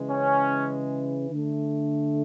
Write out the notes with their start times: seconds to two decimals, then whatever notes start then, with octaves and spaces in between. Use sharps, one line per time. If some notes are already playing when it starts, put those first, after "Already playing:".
Already playing: C#3 E3 G#3
0.10 C#4
1.29 D3 A3